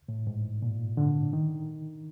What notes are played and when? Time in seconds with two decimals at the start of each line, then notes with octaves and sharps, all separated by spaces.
0.09 A2
0.27 G#2
0.62 A#2
0.97 D3
1.33 D#3